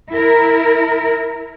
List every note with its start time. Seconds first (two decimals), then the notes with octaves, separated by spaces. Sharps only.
0.12 E4 A#4